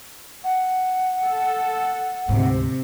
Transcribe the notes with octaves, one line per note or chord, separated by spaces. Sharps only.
F#5
A4
D2 G#2 C3